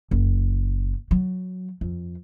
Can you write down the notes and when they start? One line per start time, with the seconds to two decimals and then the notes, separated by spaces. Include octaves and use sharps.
0.11 F#1
1.11 F#3
1.81 F2